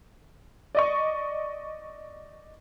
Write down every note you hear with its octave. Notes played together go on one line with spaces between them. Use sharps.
D5 D#5 C#6